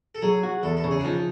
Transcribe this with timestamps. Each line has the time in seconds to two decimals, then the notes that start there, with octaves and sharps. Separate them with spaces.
0.15 A4
0.22 F#3 G#4
0.43 F#4
0.63 E2 A4
0.77 A4
0.84 C#3
0.91 G#4
1.00 D4
1.04 F3 D#4